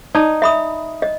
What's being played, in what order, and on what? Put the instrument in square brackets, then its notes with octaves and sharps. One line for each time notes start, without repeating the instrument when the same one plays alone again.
[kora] D#4 [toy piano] D5 A5
[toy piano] E5 B5 D#6
D#5